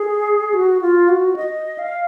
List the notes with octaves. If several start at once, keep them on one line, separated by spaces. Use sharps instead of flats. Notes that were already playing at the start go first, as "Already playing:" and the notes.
Already playing: G#4
F#4
F4
F#4
D#5
F5